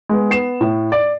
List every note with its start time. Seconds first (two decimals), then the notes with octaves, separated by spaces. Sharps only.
0.09 G#3 B3
0.30 B3 C7 E7
0.61 A2
0.92 D5